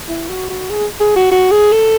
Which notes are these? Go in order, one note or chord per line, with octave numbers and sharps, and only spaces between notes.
E4
F#4
F#4
G#4
G#4
F#4
F#4
G#4
A4